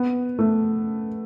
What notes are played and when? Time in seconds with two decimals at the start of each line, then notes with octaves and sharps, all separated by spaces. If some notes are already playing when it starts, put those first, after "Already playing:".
Already playing: B3
0.39 A3